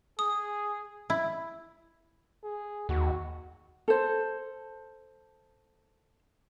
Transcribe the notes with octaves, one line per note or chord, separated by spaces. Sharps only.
G#4 D#6
E4
G#4
D#2 F#4
A4 C5